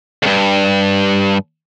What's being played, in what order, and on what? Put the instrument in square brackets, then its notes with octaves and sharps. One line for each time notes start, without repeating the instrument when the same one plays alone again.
[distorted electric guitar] D2 G2